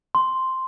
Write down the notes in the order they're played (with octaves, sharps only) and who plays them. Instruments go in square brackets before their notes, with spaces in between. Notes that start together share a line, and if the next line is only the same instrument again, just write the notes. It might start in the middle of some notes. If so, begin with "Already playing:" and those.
[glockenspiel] C6